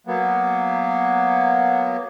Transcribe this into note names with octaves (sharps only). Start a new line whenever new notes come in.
F#3 A#3 B3